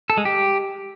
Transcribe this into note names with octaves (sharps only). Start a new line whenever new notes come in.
A4
G#3
G4